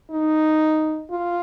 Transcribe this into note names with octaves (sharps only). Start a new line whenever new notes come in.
D#4
F4